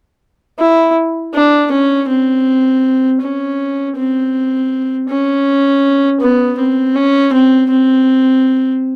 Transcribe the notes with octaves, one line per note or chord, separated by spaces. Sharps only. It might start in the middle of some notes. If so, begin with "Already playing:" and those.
E4
D4
C#4
C4
C#4
C4
C#4
B3
C4
C#4
C4
C4